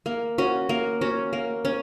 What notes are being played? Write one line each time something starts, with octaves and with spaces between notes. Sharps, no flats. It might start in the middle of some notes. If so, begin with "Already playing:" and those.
A#3
C#4 F#4
A#3
C#4 F#4
A#3
C#4